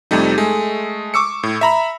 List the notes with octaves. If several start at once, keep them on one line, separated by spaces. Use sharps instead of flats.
F2 C3 G3 A3 D#4
G#3 A3
C#6 D6 E6 C#7
A2
E5 A#5 B5